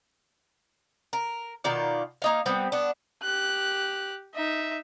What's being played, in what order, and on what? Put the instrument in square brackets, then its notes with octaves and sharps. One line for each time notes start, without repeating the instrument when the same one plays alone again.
[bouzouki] A#4
B2 D#3 F4 D5
A#3 D#4 F5
G3 B3 C4
B3 D4
[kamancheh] G4 F#6
D#4 E5